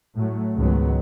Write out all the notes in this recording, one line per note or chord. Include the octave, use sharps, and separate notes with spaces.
A2 F#3 A3
C#2 G#2 D#3 F#3 B3